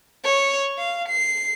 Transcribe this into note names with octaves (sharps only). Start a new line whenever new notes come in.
C#5
F5
C7